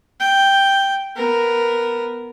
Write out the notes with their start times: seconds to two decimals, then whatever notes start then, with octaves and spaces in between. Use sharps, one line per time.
0.20 G5
1.16 B3 A#4